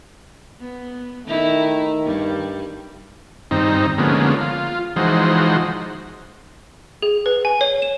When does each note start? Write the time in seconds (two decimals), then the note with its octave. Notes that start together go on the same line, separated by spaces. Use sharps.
0.61 B3
1.27 D#3 A3 D#4 E4
2.05 G2 G3
3.51 G2 D#3 C4 D#4
3.98 D3 F3 G#3 A#3 B3 C#4
4.41 F4
4.96 E3 F3 G#3 D#4 F#4 C5
7.02 G#4
7.26 B4
7.45 G#5
7.61 C#5
7.82 E7